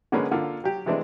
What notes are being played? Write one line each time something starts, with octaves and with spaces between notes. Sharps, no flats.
D3 G#3 A#3 B3 C#4 B4
D3 A#3 F4
F#3 G4
C3 E3 G#3 A3 D4